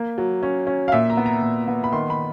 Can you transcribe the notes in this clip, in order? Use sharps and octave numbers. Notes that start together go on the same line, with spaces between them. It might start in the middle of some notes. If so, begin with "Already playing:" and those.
Already playing: A#3
F#3
C#4
C#4
F5
A#2 E5
A#5
B3
A#5
A#2
B3
B5
D#3 C6
B5